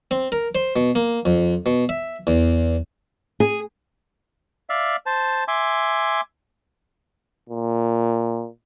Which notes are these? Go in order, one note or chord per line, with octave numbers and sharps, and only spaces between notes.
C4
A#4
C5
B2
A#3
F2
B2
E5
E2
G#4
D5 E5 F5
C5 A5
E5 G#5 C6 D6
A#2